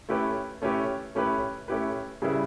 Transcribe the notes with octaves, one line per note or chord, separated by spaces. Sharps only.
A3 C#4 E4 G4 B4
A3 C#4 E4 G4 B4
A3 C#4 E4 G4 B4
A3 C#4 E4 G4 B4
C#3 G3 C#4 E4 B4